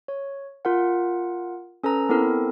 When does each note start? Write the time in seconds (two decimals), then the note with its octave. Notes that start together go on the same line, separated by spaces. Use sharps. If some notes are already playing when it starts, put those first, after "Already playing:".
0.08 C#5
0.65 F4 A#4 F#5
1.83 C#4 A4 B4 A#5
2.09 B3 C4 E4 A4 A#4